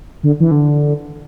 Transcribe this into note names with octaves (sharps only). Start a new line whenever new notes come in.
D3
E3
D3